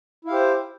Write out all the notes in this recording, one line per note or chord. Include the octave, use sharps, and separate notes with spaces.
E4 G4 C5 F5